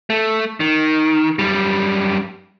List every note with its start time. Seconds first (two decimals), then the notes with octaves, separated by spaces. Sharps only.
0.10 A3
0.60 D#3
1.39 F#2 G3